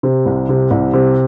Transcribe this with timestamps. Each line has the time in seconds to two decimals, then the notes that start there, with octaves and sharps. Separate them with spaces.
0.03 C3
0.26 C2
0.49 C3
0.71 C2
0.93 C3